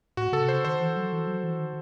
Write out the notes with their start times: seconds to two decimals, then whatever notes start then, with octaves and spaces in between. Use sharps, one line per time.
0.17 A2 F#4
0.32 C#3 A4
0.42 C3
0.48 C#3 C5
0.65 D#3 C5
0.80 E3
0.97 F#3
1.13 E3
1.27 F#3
1.44 E3
1.59 D#3